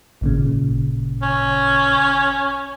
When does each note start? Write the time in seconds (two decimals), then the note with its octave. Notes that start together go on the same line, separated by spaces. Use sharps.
0.21 G#1 A#2 C#3
1.22 C#4